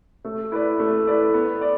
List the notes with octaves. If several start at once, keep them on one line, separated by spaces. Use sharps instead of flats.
A3
E4 B4 D5
A3
E4 B4 D5
B3
D5